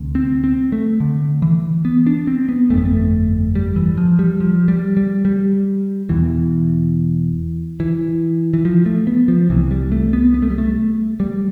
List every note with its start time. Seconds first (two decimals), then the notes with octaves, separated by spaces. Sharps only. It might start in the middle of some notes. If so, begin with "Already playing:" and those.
Already playing: D2 C3
0.15 C4
0.44 C4
0.72 A3
1.00 D3
1.42 E3
1.85 B3
2.07 D4
2.27 C4
2.49 B3
2.70 G1 F2 D3 A3
2.78 B3
2.85 A3
3.55 G3
3.76 E3
3.97 F3
4.19 G3
4.40 F3
4.68 G3
4.97 G3
5.25 G3
6.09 E1 E2 B2 E3
7.80 E3
8.54 E3
8.65 F3
8.86 A3
9.07 B3
9.28 F3
9.50 C2 C3 E3
9.71 G3
9.92 A3
10.13 B3
10.34 B3
10.42 A3
10.50 G3
10.58 A3
11.20 G3